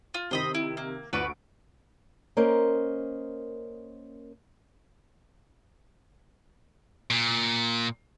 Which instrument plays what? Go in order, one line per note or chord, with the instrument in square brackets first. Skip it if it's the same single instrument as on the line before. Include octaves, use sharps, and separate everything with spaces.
[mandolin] F4
[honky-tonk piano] C3 D#3 [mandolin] C5 D#5 B5
[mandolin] E4
A#3
[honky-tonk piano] D2 C#6 D7 [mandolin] F#4 B4 D5
[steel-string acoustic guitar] A#3 C#4 A#4 C5 D#5
[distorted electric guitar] A#2